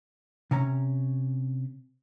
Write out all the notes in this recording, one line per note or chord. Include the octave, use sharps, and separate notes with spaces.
C3 C#4 A#5